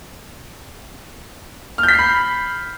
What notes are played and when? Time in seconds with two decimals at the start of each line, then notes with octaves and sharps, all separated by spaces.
1.78 F6
1.83 G6
1.88 B6
1.94 C7
1.99 B5